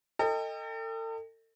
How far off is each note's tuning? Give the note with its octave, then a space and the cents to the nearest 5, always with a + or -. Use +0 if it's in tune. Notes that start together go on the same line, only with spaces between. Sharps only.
A4 +40 D#5 +0 G5 +30